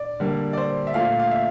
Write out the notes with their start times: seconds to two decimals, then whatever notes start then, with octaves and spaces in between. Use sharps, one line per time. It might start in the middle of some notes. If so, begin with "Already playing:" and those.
Already playing: D5
0.20 D3 G3 A#3
0.53 D5
0.57 C5
0.87 E5
0.94 A#2 A3 F5
1.19 F5
1.31 E5